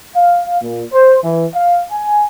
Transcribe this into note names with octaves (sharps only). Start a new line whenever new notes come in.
F5
A#2
C5
E3
F5
G#5